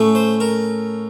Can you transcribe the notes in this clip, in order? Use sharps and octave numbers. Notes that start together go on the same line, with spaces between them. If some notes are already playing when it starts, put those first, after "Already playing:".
Already playing: A2 A3 C#4
C5
A#4